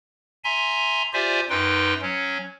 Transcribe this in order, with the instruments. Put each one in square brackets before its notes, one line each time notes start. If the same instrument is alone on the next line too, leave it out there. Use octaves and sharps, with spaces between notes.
[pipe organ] E5 G#5 A#5 C6
F4 G4 C5 D5 E5 G#5
F#2 D#4 B4 G5 C6
F#3 C#4